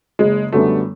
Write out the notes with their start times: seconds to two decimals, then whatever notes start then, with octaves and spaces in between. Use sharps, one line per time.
0.19 F#1 G#3
0.52 F#2 D3 G3 A3 B3